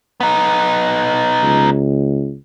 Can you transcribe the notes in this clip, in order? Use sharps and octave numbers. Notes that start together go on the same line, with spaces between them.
B3 D#4
C#2